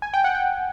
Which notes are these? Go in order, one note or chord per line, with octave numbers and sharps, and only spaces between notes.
G#5
G5
F#5
G5